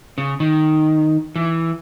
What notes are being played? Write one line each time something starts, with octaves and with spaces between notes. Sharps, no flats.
C#3
D#3
E3